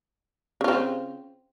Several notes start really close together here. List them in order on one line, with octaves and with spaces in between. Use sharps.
C#3 F4 C4